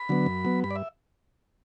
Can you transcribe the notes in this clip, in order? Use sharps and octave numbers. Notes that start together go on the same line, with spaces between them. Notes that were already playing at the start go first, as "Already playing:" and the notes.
Already playing: B5
D3 F#3 B3
F#2
F#3 B3
G2 B5
D5
E5